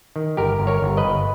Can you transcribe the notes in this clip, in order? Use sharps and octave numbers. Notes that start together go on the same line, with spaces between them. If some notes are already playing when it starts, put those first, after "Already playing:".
D#3
G1 G4 A#4
G1
A#4 C#5
G1
B4 D#5
G1